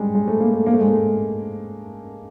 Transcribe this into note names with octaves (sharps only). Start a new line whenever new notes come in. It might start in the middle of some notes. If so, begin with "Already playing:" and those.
Already playing: G3 G#3
G#3
A3
A#3
A3
A#3
A3
G#3
A3